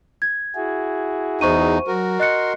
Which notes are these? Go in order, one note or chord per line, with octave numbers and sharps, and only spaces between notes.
G#6
E4 F#4 G#4
E2 D#4 C5 C#6 D#7
F#3 F#4 A#4
D#5 C6 F#6 C#7